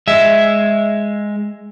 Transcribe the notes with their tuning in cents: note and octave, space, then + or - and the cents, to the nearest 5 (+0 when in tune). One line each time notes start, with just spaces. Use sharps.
G#3 +0 E5 +0